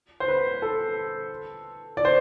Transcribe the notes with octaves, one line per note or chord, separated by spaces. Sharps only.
C5
B4
A4
D5
C5